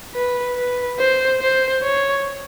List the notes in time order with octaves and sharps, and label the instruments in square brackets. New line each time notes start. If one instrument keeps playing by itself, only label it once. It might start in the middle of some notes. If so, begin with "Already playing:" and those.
[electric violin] B4
B4
C5
C5
C#5